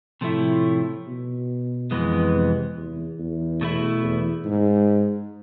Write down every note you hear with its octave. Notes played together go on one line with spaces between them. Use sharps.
A2 C3 F3 A3 E4
B2
F2 E3 G#3 B3
C3
E2
E2
B2 A3 E4
E2
G#2